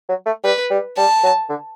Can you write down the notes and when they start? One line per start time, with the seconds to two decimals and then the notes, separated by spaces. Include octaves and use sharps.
0.09 F#3
0.26 A3
0.44 G3 B4
0.70 G3
0.97 G3 A5
1.23 F#3
1.49 D3